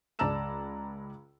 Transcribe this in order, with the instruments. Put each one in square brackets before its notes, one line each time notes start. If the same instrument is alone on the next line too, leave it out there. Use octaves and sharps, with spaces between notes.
[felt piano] C#2 D5 A5 A#5 E6 E7